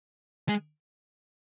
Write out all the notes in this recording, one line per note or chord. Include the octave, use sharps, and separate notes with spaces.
G#3